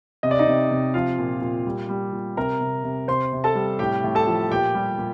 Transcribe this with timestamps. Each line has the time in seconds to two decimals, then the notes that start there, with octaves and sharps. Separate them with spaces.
0.23 C3 D#5
0.31 D5
0.39 D#4 D#5
0.47 C3
0.71 C3
0.94 F3 F4 F5
1.19 A#2
1.42 A#2
1.66 G3
1.89 G3
2.13 A#2
2.37 C3 A#4 A#5
2.61 C3
2.84 C3
3.08 C3 C5 C6
3.33 C3
3.44 A4 A5
3.55 G3
3.79 A2 G4 G5
4.04 A2
4.15 A4 A5
4.27 F3
4.51 A#2 G4 G5
4.75 G3
4.98 A#2